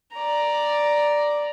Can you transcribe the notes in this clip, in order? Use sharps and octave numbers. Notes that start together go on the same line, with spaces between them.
D5 A#5